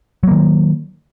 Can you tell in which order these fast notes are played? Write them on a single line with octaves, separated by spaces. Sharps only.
F#3 A#3 D#3